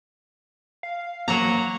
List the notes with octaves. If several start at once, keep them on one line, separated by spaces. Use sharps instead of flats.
F5
F#3 A#3 C#5 A#5